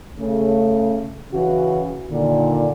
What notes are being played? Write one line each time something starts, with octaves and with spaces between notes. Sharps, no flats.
C#3 A3
C#3 E3 F#4
A#2 D3 D#3